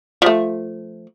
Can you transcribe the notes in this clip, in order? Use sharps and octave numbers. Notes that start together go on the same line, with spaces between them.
F3 A3